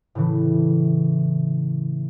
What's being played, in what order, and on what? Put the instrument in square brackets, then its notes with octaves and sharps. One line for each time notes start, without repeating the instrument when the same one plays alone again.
[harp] A2 C#3 E3